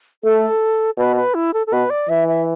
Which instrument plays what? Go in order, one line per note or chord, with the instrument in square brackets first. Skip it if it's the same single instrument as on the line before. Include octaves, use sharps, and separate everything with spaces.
[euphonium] A3 [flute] A4
[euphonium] B2 [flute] B4
[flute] B4
E4
A4
A4
[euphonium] B2 [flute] B4
[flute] D5
[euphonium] E3 [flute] E5
[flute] E5